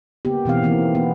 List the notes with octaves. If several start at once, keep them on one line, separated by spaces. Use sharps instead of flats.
C#3 A#3 B3 G4
B2 E3 C4 F5
D#3 E3 A#3 C4
B3